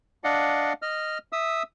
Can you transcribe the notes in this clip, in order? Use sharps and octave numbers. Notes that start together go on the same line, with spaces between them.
D4 D5 D#5 F5 F#5
D#5 F6
E5 D#6 E6